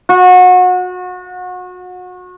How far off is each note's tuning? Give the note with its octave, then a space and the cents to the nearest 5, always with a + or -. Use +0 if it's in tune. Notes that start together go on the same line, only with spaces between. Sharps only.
F#4 -30